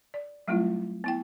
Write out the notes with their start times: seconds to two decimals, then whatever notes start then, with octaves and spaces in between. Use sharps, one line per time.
0.14 D5
0.48 F#3 G3 A3 C4 E4 F4
1.04 B3 E4 G5